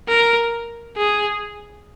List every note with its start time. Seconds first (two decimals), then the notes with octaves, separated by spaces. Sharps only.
0.08 A#4
0.97 G#4